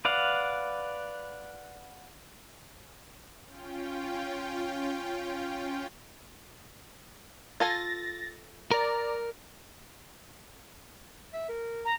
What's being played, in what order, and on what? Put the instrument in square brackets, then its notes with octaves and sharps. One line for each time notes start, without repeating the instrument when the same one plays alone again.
[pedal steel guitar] B4 D5 F5 F#5
[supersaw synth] C#4 F4 G5
[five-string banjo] F4 A4 G#5 [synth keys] A6 A#6
[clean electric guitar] A#4 [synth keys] D5 A#5
[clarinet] E5
A#4
[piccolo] A#5